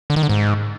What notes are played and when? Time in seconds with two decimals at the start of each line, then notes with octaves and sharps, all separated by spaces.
0.10 D3
0.16 D#3
0.23 D3
0.29 G#2